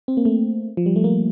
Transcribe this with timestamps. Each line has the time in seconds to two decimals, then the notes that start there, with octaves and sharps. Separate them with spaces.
0.08 C4
0.17 A#3
0.25 A3
0.77 F3
0.86 G3
0.96 A3
1.04 A#3